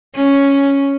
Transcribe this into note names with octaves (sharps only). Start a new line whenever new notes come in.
C#4